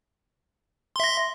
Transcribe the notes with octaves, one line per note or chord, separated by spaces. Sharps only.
E5 C6 A#6